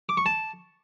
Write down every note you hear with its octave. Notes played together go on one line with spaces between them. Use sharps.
D6
C#6
A5